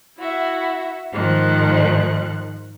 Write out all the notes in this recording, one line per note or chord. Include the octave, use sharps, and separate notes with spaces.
E4 F#4 E5
G#2 D#3 F3 C5 F#6